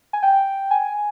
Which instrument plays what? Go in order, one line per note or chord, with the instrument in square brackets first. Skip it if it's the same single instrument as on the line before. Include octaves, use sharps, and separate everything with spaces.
[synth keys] G#5
G5
G#5